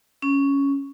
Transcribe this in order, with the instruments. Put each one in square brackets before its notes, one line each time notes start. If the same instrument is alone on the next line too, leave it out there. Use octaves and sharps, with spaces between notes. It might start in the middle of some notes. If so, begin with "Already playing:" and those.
[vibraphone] C#4